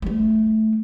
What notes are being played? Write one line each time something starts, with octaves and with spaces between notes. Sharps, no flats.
G3 A3